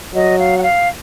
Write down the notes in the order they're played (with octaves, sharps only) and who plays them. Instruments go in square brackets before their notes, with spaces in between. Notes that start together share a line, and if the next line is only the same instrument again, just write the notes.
[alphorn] F#3 [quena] D#5
[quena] F5
F#5
F5